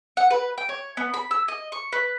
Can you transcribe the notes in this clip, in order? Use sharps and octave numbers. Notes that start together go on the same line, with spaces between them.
F#5
B4
G5
C#5
B3
B5
E6
D#5
C#6
B4